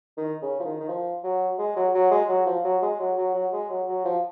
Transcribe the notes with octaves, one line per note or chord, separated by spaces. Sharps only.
D#3
C#3
F3
D#3
D#3
F3
F#3
G#3
F#3
F#3
G#3
F#3
F3
F#3
G#3
F#3
F#3
F#3
G#3
F#3
F#3
F3